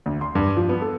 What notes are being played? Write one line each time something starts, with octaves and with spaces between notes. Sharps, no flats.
D2
C6
G2
F3
B3
A4